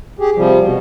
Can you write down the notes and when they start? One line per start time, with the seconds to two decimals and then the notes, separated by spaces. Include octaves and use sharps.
0.19 G4 G#4
0.36 C3 F3 G3
0.61 B2